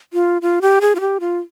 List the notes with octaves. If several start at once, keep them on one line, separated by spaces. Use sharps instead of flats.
F4
F4
G4
G#4
F4
G4
F4